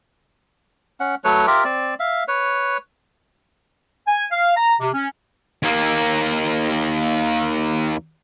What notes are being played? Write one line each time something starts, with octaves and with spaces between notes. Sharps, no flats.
C#4 F#5
F#3 A3 B4 C#5
F4 G4 A#4 E5
C4 D5
E5 F5
B4 C#5
G#5
F5
A#5
C3
C#4
D#2 A#3